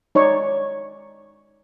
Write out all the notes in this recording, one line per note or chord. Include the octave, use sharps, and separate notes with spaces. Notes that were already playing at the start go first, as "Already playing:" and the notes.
D#4 C#5 D5 C#6